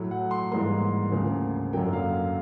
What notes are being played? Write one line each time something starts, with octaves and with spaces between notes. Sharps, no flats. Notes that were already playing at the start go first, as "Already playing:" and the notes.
Already playing: A2 F#3 A3
F#5
C6
G#2 E3 G3 A#3 C6
D2 C#3 F3 A#3
F#2 D3 F#3 A#3 G5
F5